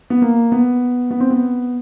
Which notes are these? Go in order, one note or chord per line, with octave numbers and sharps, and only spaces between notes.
B3
A#3
B3
B3
C4
B3